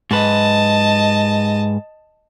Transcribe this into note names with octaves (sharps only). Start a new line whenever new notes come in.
G#2 B4 D#5 A5